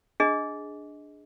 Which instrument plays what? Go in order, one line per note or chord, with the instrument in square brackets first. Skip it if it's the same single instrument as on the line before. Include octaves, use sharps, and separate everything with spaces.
[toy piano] D4 G#4 D#5